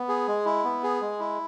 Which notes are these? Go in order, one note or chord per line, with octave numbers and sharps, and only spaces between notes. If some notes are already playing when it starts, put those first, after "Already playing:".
Already playing: B3
G#4
G#3
E4
B3
G#4
G#3
E4